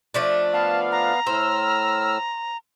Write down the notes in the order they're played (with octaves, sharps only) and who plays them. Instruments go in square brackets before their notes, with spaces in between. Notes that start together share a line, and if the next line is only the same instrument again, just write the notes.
[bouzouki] F3 A3 D4
[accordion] B3 F5 [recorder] A5
[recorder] A#5
[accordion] A2 E6 F6 [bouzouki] C5